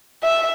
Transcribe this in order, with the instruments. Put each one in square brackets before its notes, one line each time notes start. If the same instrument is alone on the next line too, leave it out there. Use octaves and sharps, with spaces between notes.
[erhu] E5